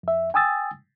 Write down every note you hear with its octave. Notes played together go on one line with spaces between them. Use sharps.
F2 E5
G5 G#5 D#6 E6 A6